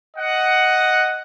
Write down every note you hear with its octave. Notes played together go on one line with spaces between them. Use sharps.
D#5 F#5